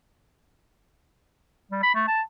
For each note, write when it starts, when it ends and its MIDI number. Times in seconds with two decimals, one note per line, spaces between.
1.71 1.82 55
1.83 1.92 83
1.95 2.04 57
2.08 2.21 81